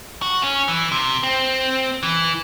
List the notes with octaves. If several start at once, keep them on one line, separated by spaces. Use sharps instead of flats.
F#4
C#4
E3
C3
C4
E3